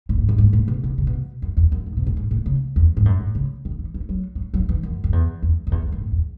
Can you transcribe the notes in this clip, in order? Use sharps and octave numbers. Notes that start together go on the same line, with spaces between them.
A2
G#2
F#2
G#2
A2
B2
B2
C#3
B2
F#2
E2
F#2
G#2
B2
A2
G#2
A2
C#3
E2
G#2
F#2
A2
C#3
D#3
E3
E3
F#3
F#3
F#3
E3
F#2
F#2
E2
E2
F#2
E2
E2
F#2
A2
E2